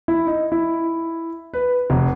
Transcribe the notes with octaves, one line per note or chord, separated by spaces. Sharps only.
E4
D#4
E4
B4
F1